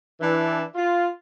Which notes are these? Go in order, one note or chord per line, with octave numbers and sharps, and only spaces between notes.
E3 D4
F4